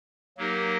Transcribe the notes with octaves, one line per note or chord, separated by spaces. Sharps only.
F#3 A#3 D#4 G4 A#4